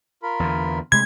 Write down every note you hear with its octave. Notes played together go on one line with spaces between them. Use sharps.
F4 A#4 B5
E2 D3
C3 G#3 A3 B5 C6 G#6